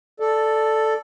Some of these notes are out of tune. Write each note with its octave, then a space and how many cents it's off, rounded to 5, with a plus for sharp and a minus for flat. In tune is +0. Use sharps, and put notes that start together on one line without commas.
A4 +0 D5 +5